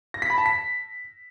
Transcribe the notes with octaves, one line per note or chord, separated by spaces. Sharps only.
A#6
B6
B5
A5
B6